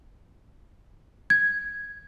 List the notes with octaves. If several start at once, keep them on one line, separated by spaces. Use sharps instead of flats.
G#6